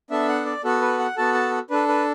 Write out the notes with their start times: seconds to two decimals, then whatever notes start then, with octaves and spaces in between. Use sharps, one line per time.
0.11 B3 D4 A4 E5
0.28 F#5
0.45 D5
0.64 B3 F#4 A4
0.81 B4
0.99 F#5
1.17 B3 F#4 A4 A5
1.34 A5
1.70 D4 A4 B4
1.88 B4